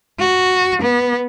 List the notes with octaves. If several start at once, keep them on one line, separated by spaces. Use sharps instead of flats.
F#4
B3